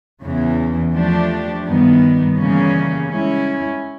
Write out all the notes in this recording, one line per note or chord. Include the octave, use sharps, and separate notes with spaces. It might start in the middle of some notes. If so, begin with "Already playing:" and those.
E2 C#3 E3
F3 A3 D4 G4
G2 D#3 G3 B3
C#3 E3 G3 A#3 C#4
G#3 C#4 E4